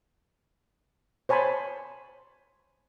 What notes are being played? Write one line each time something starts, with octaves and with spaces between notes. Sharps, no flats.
C5 C#5 G#5 A5 B5 C6